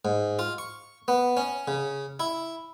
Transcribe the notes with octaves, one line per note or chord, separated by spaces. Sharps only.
G#2
F4
C#6
B3
C#4
C#3
E4